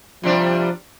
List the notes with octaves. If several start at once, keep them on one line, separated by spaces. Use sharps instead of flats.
C3 F3 G3 D4